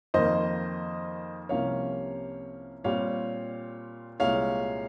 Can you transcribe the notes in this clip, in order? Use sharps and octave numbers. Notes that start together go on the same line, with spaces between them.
F2 D#3 A#3 C5 D#5
C2 C3 F3 A#3 C#4 C#5 F5
A#2 G3 C4 C#5 F5
C2 A#2 G#3 C#5 F5